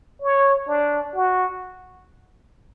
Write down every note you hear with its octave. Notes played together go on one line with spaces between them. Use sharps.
C#5
D4
F#4